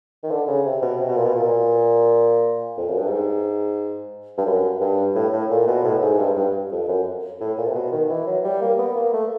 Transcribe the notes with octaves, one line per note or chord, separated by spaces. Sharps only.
D#3
D3
C#3
C3
B2
C3
B2
A#2
B2
A#2
F2
F#2
G2
G#2
G2
F#2
G2
A2
A2
A#2
B2
A2
G#2
G2
G2
F2
F#2
A2
A#2
C3
B2
D#3
E3
F#3
G3
A#3
B3
A#3
A3